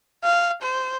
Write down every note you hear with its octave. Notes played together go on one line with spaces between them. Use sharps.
F5
C5